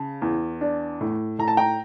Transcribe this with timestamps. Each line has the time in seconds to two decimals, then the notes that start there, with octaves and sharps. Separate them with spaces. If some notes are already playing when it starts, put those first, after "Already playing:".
Already playing: C#3 A5
0.22 E2
0.61 D4
1.01 A2
1.39 A2 A#5
1.48 A5
1.57 G5 A#5